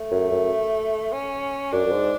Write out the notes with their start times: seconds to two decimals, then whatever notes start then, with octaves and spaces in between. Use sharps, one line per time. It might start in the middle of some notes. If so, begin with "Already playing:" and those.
Already playing: A3
0.11 F#2
0.31 F#2
1.12 C#4
1.72 F#2 D4
1.86 F#2
1.91 G#2